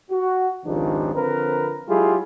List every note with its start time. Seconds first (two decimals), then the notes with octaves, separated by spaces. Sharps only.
0.11 F#4
0.65 G#1 C#2 D#3 F3 D4 G4
1.14 D3 F3 C4 A#4 B4
1.89 F#3 G#3 E4 F4 G4 G#4